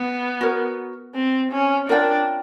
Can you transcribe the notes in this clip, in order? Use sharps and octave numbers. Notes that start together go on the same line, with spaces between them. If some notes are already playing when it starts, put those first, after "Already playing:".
Already playing: B3
F#4 A#4 C#5
C4
C#4
D4 F4 A#4 D5 G5